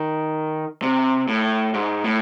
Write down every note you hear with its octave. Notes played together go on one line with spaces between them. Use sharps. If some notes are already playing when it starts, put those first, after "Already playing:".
Already playing: D#3
C3
A2
G#2
A2